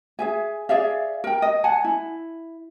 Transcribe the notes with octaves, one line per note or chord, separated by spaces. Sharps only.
G#4 E5 G#5
G#4 D5 E5 F5
A#4 G5
D#5
F#5 G#5 A5
E4